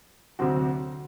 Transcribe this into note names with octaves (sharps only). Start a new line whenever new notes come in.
D2 C3 F#3 C4 F#4